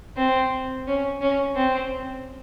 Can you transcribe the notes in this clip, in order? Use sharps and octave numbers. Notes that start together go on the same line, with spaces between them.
C4
C#4
C#4
C4